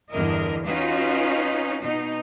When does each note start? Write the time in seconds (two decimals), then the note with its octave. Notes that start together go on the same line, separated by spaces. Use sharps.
0.12 E2 G2 D3 E4 A#4 D#5
0.65 C#4 D#4 F4 F#4 B4
1.83 B2 D#4